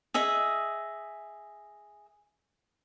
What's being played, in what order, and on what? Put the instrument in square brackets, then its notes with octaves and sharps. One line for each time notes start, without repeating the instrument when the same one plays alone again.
[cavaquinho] G#4 D#5 E5